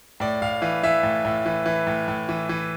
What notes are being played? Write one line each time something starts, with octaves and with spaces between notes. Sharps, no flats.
A2 D5
A2 F5
E3 F5
E3 E5
A2
A2
E3
E3
A2
A2
E3
E3